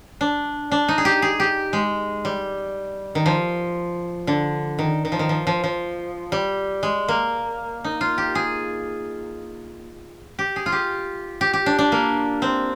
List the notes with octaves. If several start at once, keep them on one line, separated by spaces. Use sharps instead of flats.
D4
D4
D#4
G#4
G4
G#4
G4
G#3
G3
D#3
F3
D3
D#3
D#3
F3
D#3
F3
F3
F3
G3
G#3
A#3
D#4
F4
G4
G#4
G4
G#4
F4
G4
G4
G4
D4
D4
A#3
C4